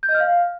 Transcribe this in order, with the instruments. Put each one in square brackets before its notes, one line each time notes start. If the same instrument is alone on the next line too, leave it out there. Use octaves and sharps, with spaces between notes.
[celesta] G6
D#5
F6
F5